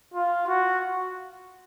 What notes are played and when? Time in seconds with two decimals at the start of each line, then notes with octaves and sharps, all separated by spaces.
0.14 F4
0.47 F#4